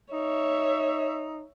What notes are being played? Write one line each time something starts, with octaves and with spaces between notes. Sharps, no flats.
D#4 C#5 E5